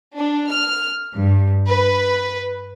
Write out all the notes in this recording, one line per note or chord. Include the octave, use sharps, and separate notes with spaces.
D4
F6
G2
B4